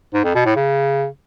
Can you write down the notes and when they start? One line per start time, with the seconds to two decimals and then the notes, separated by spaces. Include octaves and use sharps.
0.14 G#2
0.24 F2
0.35 B2
0.45 A2
0.56 C#3